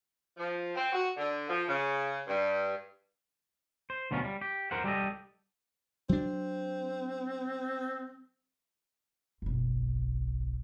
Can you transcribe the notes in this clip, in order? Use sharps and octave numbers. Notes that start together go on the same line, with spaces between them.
F3
C4
F#4
D3
F3
C#3
G2
C5
D2 B2 F#3 C#4 F4
G3
G4
A#4 C5 F#5
G3 G4 A4 D#5
F#3 C4 D4
F#1 B1